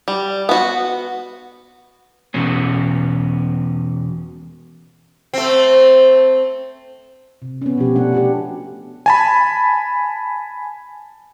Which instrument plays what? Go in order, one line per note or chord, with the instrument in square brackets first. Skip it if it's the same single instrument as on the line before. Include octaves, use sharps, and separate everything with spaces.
[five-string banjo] G3
B3 F#4
[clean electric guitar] E2 B2 C#4
[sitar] A3 C4
[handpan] C3
B3 C#4
B2 F3 G4
A3 D4 F#5
D4 F#4 G4
[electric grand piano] G#5 A5 B5